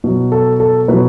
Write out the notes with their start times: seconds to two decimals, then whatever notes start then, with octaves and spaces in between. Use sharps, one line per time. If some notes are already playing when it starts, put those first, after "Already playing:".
0.04 B2 F#3
0.32 A4
0.60 A4
0.88 B2 F#3 B4